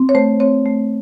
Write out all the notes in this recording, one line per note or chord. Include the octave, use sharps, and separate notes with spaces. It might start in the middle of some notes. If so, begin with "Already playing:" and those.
Already playing: C4
C#5
A3 C5
C4 C#5
A3